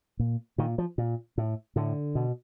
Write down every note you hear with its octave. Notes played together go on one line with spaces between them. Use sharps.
A#2
A#2 D#3
F3
A#2
A2
A2 D3
B2